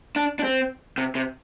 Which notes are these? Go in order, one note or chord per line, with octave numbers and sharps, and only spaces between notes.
D4
D4
C4
C3
C3